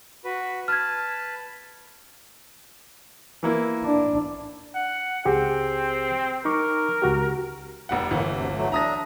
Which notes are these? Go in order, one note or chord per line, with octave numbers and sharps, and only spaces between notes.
F#4 B4
B4 A5 F6 G#6
E3 A#3 E4
D4
F#5
C#2 C4 G4 G#4
D#4 A#4 C#6 D6
C#2 F#4 G4
F1 G3 F#5
G1 D#3 E3 A3 A#3
D2 C3
F#3 A3
D4 E5 A#5 D#6 A#6